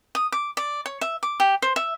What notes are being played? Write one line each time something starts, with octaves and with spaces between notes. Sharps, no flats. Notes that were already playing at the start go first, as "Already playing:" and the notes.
D#6
D6
D5
C#5
E5
D6
G4
C5
E5